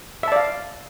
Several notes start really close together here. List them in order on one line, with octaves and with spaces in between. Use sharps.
E5 A5 D5 F5